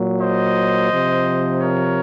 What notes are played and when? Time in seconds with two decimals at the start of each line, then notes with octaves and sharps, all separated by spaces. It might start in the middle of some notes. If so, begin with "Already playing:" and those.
Already playing: A#2 F#3
0.21 C5 D#5
0.91 C3 F3
1.61 A#4 C#5